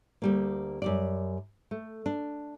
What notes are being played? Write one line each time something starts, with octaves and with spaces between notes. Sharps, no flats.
D2 G3 A#3
F#2 G3 D5
A3
D4